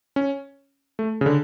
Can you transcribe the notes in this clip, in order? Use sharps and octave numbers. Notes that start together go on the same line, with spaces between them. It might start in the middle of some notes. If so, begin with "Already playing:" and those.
C#4
A3
C#3
D3